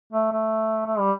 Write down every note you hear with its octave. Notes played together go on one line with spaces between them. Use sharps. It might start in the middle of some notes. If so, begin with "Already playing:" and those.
A3
A3
A3
G3